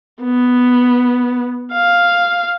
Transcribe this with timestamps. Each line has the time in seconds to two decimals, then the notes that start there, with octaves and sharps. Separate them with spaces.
0.22 B3
1.73 F5